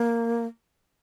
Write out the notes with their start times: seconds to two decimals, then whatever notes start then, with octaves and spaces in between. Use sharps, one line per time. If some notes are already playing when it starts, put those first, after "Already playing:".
Already playing: A#3